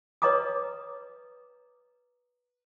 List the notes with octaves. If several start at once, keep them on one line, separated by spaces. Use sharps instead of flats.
B4 C#5 D#5 A#5 D6 D#6